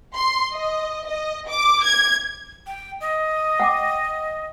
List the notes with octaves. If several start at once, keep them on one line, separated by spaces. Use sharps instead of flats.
C6
D#5
D#5
D6
G#6
G5
D#5
F#5 G5 D6